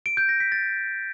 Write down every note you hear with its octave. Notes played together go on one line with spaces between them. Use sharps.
D7
G6
A#6
B6
A6